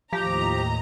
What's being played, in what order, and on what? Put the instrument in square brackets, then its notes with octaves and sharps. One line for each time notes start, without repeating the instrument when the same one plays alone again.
[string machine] D#2 A2 D#5 [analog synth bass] F3 [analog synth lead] G4 [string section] A#5